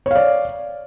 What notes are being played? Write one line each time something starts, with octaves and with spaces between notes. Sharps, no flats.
C#5 D5 F5